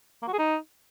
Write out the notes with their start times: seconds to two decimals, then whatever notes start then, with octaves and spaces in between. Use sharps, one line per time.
0.22 A#3
0.28 F#4
0.33 G#4
0.39 D#4